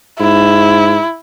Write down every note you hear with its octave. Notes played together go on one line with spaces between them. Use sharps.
G#2 E4